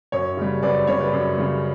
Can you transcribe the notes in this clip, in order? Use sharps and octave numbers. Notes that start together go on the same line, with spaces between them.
F#2 C#5
C#3 G3
F#2 B4 D5
C#3 G3 C#5
B4 D5
F#2
C#3 G3